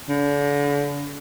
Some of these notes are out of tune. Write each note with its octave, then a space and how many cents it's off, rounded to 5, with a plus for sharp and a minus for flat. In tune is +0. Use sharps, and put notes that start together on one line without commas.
D3 -40